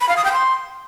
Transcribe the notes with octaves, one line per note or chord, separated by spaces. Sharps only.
B5
F5
D#6
G5
C6